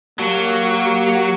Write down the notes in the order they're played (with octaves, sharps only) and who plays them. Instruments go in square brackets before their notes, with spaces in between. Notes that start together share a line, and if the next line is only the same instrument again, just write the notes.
[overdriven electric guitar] F#3 [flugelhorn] A#3 [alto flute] G4